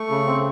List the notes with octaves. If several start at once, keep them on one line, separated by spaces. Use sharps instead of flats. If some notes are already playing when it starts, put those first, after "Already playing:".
Already playing: A3 C#6
C#3
C4